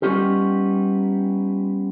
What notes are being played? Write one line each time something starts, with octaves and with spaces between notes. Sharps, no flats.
G3 B3 C#4 D#4 F4 G4